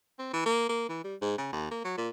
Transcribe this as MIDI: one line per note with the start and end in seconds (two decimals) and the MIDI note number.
0.19 0.28 60
0.33 0.42 52
0.46 0.68 58
0.69 0.85 58
0.89 1.02 52
1.04 1.15 55
1.22 1.35 44
1.38 1.48 49
1.52 1.69 39
1.71 1.79 58
1.84 1.95 54
1.97 2.09 46